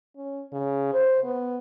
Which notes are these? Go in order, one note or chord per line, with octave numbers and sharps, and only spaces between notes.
C#4
C#3
C5
B3